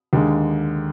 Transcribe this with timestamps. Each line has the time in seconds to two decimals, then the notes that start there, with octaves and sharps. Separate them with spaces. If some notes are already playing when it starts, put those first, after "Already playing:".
0.13 D#2 D3 G#3